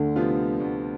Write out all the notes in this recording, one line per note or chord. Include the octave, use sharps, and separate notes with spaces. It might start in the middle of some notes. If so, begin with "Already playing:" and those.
Already playing: D2 D3
C3 F3 B3 F4
D2